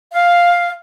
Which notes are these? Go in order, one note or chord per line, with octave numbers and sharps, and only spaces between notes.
F5